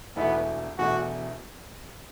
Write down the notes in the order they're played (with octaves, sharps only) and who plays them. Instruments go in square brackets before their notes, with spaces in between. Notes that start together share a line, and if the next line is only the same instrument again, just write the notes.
[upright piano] E1 E2 B2 A3 E4 [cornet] B3
[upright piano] E1 E2 B2 A3 E4 [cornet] F#4